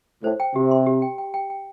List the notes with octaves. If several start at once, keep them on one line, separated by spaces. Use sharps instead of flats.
A2 C5
G5
C3 G4
C6
G4
G5
G5
G5
G5